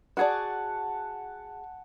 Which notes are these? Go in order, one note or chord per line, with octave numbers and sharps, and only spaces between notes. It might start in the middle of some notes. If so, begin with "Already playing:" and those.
F#4 G#4 D5 F#5 G#5 A5